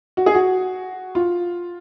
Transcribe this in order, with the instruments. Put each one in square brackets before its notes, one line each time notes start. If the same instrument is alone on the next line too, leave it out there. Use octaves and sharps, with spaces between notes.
[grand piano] F#4
G#4
F#4
F4